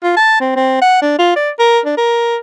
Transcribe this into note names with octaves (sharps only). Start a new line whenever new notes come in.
F4
A5
C4
C4
F#5
D4
F4
D5
A#4
D4
A#4